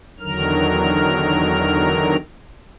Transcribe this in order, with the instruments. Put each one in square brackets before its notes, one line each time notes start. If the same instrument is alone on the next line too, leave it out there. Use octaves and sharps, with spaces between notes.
[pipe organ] E2 D3 D#3 F#3 A#4 F6